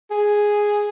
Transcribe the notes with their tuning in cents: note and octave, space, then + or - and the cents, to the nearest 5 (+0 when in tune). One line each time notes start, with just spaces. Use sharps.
G#4 +0